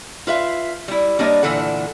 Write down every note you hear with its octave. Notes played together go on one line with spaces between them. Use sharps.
F4 B4 E5 F5
G3 E4
G3 A#3 D4 B4 C#5 D#5
A#2 D3 E3 D4 A4 F#5